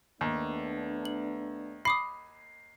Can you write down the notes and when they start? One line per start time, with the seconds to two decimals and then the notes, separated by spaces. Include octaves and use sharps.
0.21 D#2 A3 B3 D4
1.05 F#7
1.85 B5 D6 D#6 C7